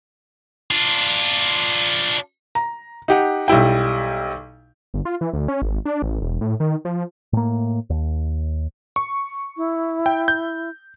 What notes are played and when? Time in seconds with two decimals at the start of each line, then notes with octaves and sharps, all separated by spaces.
0.71 D4 F4
2.55 A#5
3.08 D#4 G4 F#5
3.48 B1 G3 E4 G5
4.94 G1
5.05 F4
5.21 E3
5.33 D2
5.48 C#4
5.62 G#1
5.85 D4
6.02 A1
6.22 E1
6.41 A2
6.60 D#3
6.85 F3
7.33 A2 A#3
7.90 D#2
8.96 C#6
9.57 E4
10.06 G5
10.28 G6